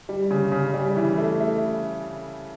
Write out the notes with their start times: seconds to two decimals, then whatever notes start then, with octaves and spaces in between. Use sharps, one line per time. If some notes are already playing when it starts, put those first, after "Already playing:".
0.09 G3
0.31 C#3
0.52 C#3
0.74 G3
0.96 E3
1.18 A3
1.40 A3